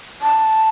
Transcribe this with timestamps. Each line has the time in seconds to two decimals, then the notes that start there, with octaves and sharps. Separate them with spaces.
0.22 A5